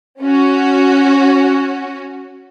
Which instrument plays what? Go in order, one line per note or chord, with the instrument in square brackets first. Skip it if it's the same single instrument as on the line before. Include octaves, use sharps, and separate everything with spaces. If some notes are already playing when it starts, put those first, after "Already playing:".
[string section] C#4 F#4